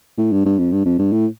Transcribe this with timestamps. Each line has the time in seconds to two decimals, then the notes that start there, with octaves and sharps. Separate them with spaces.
0.18 A2
0.32 G2
0.45 G2
0.58 F2
0.72 G2
0.86 F2
0.99 G2
1.13 A2